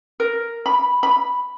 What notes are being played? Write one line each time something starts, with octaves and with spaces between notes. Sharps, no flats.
A#4
B5
B5